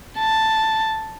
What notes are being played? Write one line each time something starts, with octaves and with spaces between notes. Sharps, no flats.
A5